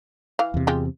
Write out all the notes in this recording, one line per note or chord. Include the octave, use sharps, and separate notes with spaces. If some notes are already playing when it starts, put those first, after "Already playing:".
E3 F5
E2 C3
G#3 F4 G4